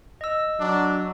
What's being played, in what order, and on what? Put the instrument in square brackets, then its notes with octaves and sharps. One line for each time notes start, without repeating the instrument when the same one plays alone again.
[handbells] D#5 E6
[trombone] F#3 [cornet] D4